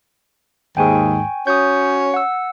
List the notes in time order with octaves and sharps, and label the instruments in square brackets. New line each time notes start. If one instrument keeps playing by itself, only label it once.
[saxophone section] D#2 G#2 [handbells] G5 G#5 C#6
[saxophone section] C#4 F#4 C#5 [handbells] D#6 G6
[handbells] F#5 E6